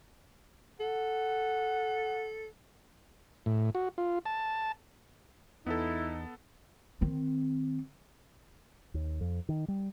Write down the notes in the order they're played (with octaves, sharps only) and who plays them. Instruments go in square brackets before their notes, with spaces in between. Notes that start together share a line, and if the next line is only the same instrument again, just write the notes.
[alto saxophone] A4 [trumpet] F#5
[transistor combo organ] A2
F#4
F4
A5
[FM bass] E2 [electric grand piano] B3 A4 [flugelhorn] D#4 [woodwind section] E4
[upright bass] D#3 C4
[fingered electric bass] D#2
F2
D#3
G3